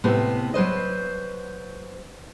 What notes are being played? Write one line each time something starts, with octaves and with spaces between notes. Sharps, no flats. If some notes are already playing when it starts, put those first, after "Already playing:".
A2 C3 B3 C4
F#3 B4 C5 D#5